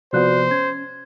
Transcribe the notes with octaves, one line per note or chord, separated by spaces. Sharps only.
C3 F3 B3 F#4 C5 D5 F#6
C#4 G#6